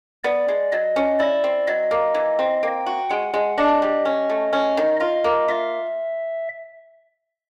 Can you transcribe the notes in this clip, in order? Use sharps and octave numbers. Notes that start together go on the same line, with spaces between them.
B3 D5
G#3
F#3 D#5
C#4
E4 D5
C4
F#3 D#5
A#3
E3
C4
A#3 G5
F#4
G#3 F#5
G#3
D4 D#5
G3
C#4
A3
C#4
D#3
F4 D#5
A#3
F4 E5